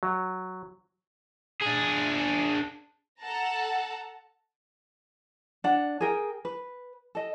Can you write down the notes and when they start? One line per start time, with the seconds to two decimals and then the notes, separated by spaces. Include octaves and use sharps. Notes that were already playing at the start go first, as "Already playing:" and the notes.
0.03 F#3
1.62 D4 G#4
3.21 A4 F#5 A5 A#5
5.64 D4 F#5
6.01 G#4 A#4 G5
6.45 B4
7.15 A4 D#5